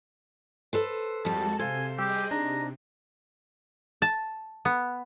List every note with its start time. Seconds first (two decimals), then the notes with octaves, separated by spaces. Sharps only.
0.73 A4 B4 C5
1.25 F2 F3 G3 G#3 F#4 A4 A5
1.59 C3 A4 C5 F5 G#5
1.98 G3 G4 G#4 D#5 G5 E6
2.31 C3 D4 D#4 A#5
4.02 A5
4.65 B3